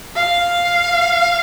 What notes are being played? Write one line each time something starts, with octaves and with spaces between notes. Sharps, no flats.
F5